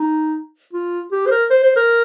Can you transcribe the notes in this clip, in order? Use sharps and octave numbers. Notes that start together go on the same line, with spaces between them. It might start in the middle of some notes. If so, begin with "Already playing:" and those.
Already playing: D#4
F4
G4
C5
A#4
C5
C5
A#4